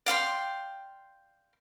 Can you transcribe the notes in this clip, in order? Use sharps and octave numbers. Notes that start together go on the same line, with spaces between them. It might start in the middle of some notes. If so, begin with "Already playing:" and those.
D5 F5 G5 C6